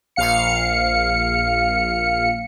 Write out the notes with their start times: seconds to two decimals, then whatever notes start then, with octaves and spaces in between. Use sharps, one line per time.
0.16 A#1 F5 C#7